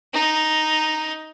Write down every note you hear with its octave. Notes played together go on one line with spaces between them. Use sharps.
D#4